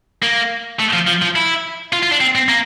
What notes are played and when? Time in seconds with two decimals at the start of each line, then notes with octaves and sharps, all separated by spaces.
0.23 A#3
0.80 A3
0.94 F3
1.08 F3
1.22 F3
1.36 E4
1.93 F4
2.03 F4
2.12 D4
2.20 C4
2.35 C4
2.49 A#3